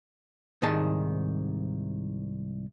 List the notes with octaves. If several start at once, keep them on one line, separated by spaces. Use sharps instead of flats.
C2 G#2 D#3 G#4 A5